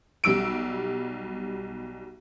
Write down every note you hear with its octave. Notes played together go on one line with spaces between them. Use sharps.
B1 G3 E6 D7